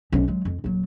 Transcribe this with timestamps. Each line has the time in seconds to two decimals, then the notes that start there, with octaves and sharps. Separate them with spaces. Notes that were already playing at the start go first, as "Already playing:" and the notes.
0.12 B1 C#4
0.28 F#3 G#3
0.45 F2
0.64 D#1 F#3